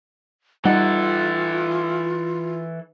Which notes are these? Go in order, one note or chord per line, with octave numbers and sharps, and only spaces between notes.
E3 G3 D#4 F4 A4 F#5